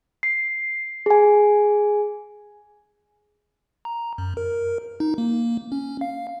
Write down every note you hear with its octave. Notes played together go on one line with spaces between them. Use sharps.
C7
G#4 G#5
A#5
F#2
A#4
D#4
A#3
C#4
F5